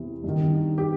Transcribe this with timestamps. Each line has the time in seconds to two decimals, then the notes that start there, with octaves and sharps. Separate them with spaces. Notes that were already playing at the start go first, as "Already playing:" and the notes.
Already playing: E2 C3 E3
0.24 G2 D#3
0.78 G4